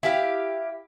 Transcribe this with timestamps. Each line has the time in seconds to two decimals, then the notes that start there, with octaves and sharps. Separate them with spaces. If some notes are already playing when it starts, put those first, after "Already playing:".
0.03 E4 G4 F5